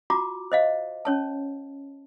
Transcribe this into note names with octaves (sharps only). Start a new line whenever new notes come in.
F4 F#4 A#5 D6
C5 D#5 F5
C#4 C#5 A5